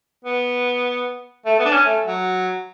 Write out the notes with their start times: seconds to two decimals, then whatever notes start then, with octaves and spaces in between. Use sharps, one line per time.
0.25 B3
1.46 A3
1.59 B3
1.65 D4
1.72 C#4
1.86 A3
2.06 F#3